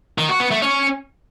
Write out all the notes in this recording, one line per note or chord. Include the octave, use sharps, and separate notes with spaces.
D#3
F#4
B3
A3
C#4